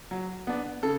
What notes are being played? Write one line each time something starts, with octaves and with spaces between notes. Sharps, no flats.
F#3
B3 D4
C#3 A4